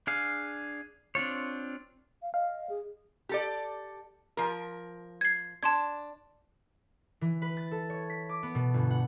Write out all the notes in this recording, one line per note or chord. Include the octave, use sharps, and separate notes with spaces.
D4 G#4 F5
C4 D4 F4 C#5
F5
D#5 F5
G#4
G4 A4 D5
F3 A#4
G#6 C7
D4 A5 C6 G#6
E3
B4
A6
A4
C#5
B6
D6
B3
B2
G1
F#5